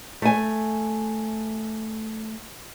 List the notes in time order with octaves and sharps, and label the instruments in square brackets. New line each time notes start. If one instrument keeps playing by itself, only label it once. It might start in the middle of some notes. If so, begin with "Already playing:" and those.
[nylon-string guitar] A3 G#5